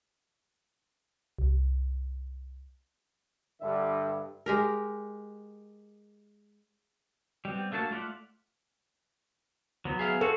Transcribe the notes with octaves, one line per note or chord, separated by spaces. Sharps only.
C2
G2 D3 E5
G#3 G4 A#4
G3 B3 C4
A3 A#3 D4 F#4 A5
A3 F4 D5 E5 F#5
F#3 B3
G#4 E5 F5
C4 F#4 A4